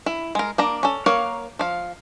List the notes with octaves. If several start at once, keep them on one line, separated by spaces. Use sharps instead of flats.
E4
G#3 A#4
A#3 D4 A#5
C#4 A4
A#3 A#4 C#5 F5 F#5
F3 F5